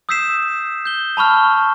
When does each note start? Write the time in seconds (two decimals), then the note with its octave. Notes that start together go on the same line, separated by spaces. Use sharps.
0.09 D#6 E6 G6 B6 C7 E7
0.85 G6 G7
1.17 A5 B5 C#6 F6